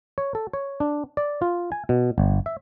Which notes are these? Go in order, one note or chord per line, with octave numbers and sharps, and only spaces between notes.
C#5
A4
C#5
D4
D5
F4
G#5
B2
G1
E5